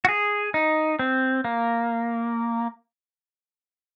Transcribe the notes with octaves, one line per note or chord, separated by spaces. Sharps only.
F#4
G#4
D#4
C4
A#3